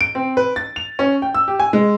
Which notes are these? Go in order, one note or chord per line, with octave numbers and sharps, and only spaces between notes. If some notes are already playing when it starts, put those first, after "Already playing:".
D7
C4
B4
A6
F7
C#4
G5
E6
G4
G#5
G#3